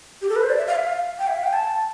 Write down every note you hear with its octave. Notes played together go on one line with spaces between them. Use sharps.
G4
A4
B4
C5
D5
E5
F5
E5
F5
G5
E5
F5
G5
A5